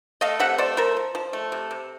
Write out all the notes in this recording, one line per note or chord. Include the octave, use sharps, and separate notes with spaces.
A3 D#5 F5
C3 E5 F#5
A3 C5 D5
F3 A#4 C5
F3
F3
A3
C3
C3